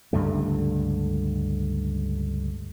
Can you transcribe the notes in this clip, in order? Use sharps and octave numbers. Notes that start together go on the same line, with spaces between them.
C#2 G2 D3 A3